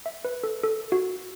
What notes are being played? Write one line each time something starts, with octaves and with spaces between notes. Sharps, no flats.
E5
B4
A4
A4
F#4